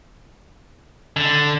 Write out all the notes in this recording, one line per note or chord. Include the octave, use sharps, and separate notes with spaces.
D3